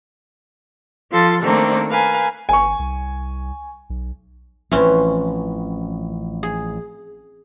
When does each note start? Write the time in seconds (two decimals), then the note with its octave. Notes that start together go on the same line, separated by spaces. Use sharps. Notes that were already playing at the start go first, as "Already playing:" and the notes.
1.10 F3 F4 A4 C6 A6
1.43 D#3 A3 A#3 C4 D4 A4
1.89 A#4 B4 F5 G#5
2.49 G1 G#5 C#6
2.79 C2
3.90 B1
4.71 A1 E3 F3 C4 C#4
6.43 G#4